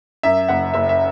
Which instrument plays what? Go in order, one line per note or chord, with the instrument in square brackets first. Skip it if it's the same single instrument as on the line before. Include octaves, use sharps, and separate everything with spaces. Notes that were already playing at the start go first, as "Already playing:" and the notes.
[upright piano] F#2 E5
F#1 F#5
F#1 E5
E5